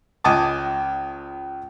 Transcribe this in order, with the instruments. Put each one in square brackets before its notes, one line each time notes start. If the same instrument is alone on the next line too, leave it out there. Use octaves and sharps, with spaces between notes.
[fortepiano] C#2 D#5 G#5 A5 D6